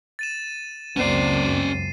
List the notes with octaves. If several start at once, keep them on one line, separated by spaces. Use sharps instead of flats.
A6 D#7 E7
C#2 F#2 A#3 C4 C#4 D5 C7 D#7